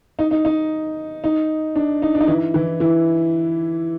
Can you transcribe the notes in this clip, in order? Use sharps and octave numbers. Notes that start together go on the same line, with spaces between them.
D#4
D#4
D#4
D#4
D4
D#4
D4
D#4
E3 E4
E3 E4
E3 E4